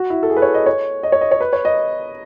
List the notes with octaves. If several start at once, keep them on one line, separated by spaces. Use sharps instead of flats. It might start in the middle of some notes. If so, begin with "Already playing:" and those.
Already playing: F#4
E4
A4
G#4
B4
C#5
D#5
C#5
D#5
C#5
D#5
C#5
B4
C#5
D#5